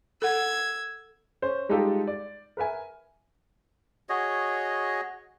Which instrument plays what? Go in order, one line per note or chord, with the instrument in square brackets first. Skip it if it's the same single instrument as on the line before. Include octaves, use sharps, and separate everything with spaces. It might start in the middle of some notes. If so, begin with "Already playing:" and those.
[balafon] A4 F#5 [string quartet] E6 G#6
[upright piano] C#4 C5
G3 G#3 D#4 F4 G4 A4
D5
A#4 B4 E5 G#5
[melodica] F#4 G#4 C#5 D#5